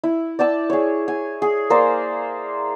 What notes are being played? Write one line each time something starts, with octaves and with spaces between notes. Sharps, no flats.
E4
D5 G5 A5 E6
G#4 C#5
G#5
G#4
A#3 A#4 C5 D5